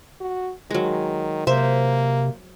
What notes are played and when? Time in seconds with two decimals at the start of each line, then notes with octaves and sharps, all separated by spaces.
0.21 F#4
0.71 D#3 F#3 G#3
1.47 C3 A#3 C5 E5